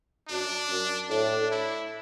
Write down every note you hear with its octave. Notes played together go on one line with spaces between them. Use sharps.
F#2 D4
F#2
A2 D4
E4